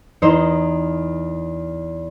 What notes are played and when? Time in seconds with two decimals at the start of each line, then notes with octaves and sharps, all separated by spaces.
0.22 E2 D#4 C5 E7